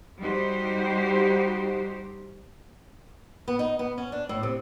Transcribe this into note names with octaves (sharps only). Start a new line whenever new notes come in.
G3 D#4 F#4 G4 C5
B3
D#4
B3
C#4
D4
A2
C3